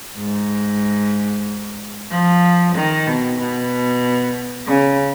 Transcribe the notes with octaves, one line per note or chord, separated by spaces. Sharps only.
G#2
F3
D#3
B2
B2
C#3